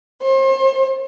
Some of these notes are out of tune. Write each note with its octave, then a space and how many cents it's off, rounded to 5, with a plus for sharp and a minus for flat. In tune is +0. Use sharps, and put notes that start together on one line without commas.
C5 +40